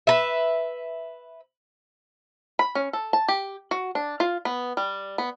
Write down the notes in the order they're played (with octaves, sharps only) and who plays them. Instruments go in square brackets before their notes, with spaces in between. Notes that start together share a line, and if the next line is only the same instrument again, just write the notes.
[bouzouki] B4 E5
[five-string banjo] B5
C#4
A4
A5
G4
F#4
D4
F4
B3
G3
B3